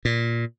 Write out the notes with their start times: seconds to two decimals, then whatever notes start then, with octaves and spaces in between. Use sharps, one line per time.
0.05 A#2